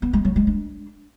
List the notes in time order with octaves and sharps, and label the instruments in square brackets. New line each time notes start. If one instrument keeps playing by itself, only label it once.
[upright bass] B3
G#3
F#3
G#3
D4